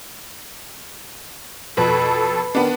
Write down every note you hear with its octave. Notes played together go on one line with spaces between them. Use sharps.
F2 B2 A4 B4
D#3 B3 D4